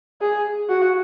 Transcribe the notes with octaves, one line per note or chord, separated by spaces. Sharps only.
G#4
F#4